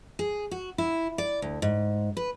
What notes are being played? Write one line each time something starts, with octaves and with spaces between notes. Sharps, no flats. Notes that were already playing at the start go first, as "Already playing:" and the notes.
G#4
F#4
E4
D5
D2
G#2
B4